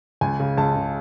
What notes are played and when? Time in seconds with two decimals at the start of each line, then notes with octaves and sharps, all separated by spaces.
0.21 C#2 G#5
0.40 C#3
0.58 C#2 A5
0.76 C#3